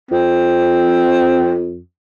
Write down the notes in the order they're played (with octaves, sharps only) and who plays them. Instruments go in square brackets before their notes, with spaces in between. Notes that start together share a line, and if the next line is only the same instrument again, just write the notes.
[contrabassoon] F2 [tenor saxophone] C4